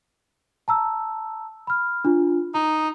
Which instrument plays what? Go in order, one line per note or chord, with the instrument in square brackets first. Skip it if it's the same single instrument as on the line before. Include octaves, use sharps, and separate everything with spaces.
[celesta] A5 A#5 E6
B5 F6
D4 F4
[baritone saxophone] D#4 [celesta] A#5